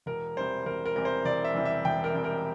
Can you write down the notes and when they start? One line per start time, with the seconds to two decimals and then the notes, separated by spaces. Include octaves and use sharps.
0.06 E1 A#4
0.36 E2 C3 G3 C5
0.66 E1 A#4
0.86 A#4
0.96 E2 C3 G3 A#4
1.05 C5
1.25 E1 D5
1.45 E5
1.54 E2 C3 G3
1.65 E5
1.85 E1 G5
2.04 A#4
2.14 E2 C3 G3
2.24 A#4